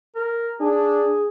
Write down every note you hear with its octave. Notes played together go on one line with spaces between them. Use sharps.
A#4
D4 G#4